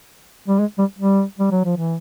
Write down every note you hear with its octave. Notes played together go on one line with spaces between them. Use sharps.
G3
G#3
G3
G3
G3
F#3
F3
E3